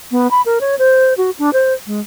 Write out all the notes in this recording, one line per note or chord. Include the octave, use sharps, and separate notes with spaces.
B3
B5
A#4
C#5
C5
F#4
D4
C5
G#3